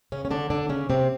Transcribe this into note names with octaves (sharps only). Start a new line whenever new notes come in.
C#3 C#4
C#4
D3 D4
D3 D4
C#3 C#4
C3 C4